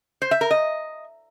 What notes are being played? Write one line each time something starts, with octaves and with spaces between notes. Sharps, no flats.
C5
E5
A#4
D#5